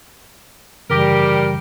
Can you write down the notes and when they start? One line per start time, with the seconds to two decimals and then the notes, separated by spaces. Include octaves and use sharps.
0.90 F#2 C#3 E3 G3 G4 A#4